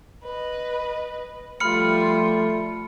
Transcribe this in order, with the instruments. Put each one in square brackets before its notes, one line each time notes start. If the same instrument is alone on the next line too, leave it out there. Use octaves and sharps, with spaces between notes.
[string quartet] B4 D#5
[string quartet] F3 G3 F4 [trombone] A3 [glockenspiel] B5 F6 C#7